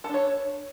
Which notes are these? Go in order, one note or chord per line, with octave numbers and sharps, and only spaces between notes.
D4 A4 C#5